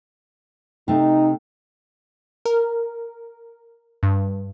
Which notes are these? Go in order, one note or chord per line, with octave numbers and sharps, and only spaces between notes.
C3 A3 D#4
A#4
G2